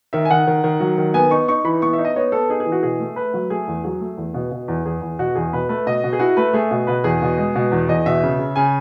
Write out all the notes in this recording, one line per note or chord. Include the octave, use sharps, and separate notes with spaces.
D#3 E5
G#5
D#3 F#5
D#3
D#3
F#3
D#3
B3 G#5
D#4 C#6
D#4 C#6
E3 B5
B3 C#6
D#4 E5
D#5
B3 C#5
B3 A4
D#4 G#4
G#4
E3
F#4
B2 G#4
A3
A3 B4
F#3
A3 G#4
E2
F#3 G#4
A3
E2
B2
B2
E2
E2 G#4
E2
B2 F#4
E2 G#4
B2 B4
A3 B4
B2 D#5
B2
G#4
E4 F#4
A3 B4
A3 G#4
B2
B2 B4
E2 G#4
B2
G#3
B2
E2
E2 D#5
B2 E5
C#3
C#3
C#3 G#5